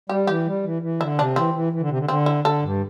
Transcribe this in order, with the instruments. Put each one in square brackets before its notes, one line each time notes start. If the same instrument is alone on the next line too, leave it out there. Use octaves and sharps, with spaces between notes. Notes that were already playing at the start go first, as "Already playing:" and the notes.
[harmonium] G3 [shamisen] G4
[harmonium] E3 [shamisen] G4
[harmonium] G3
E3
E3
[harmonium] D3 [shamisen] E4
[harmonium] C3 [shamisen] D4
[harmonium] E3 [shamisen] C4
[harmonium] E3
E3
D3
C3
D3
[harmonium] D3 [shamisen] C4
[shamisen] E4
[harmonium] D3 [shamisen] A4
[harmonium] G2